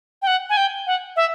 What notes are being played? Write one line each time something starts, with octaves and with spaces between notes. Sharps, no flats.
G5
F#5
G#5
G5
F#5
E5